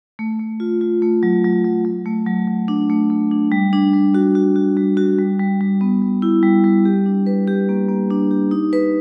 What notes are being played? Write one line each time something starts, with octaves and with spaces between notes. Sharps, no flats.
A3
A3
F4
F4
A3
F#3
F#3
F#3
F#3
A3
F#3
F#3
D4
A3
A3
D4
G3
D4
G3
F#4
F#4
F#4
G3
F#4
G3
G3
G3
B3
G3
E4
G3
G3
G4
D4
B4
G4
A#3
A#3
D4
G4
D#4
B4